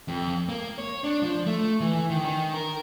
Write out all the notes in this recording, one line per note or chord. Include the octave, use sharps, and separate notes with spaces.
F2
A#3
C#5
D4
F3
A3
E3
D#3
D#3
A#4